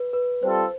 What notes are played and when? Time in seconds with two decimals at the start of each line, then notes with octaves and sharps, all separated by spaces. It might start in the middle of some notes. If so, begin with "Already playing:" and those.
Already playing: B4
0.13 B4
0.43 G3 C4 F4 A4 C5